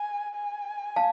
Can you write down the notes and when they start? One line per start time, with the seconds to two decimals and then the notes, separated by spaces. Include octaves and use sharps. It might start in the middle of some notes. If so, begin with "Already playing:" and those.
Already playing: G#5
0.34 G#5
0.96 F5 A5